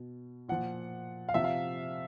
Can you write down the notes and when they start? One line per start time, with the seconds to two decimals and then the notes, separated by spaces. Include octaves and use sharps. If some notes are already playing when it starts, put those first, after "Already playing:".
Already playing: B2
0.48 A#2 F3 F#5
1.29 F5
1.34 C3 F3 E5
1.44 F5